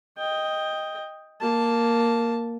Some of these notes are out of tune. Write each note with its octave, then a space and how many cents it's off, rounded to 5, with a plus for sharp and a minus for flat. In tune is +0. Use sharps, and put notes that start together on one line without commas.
D#5 +5 G5 +10
A#3 +0 A5 +0